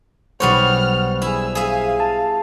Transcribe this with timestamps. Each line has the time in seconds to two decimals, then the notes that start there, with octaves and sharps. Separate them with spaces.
0.40 B1 G3 B3 C5 C#5 F#5 F6
1.22 E4 G#4 E6
1.55 G#4 E5 F5 G#5
2.00 F5 A5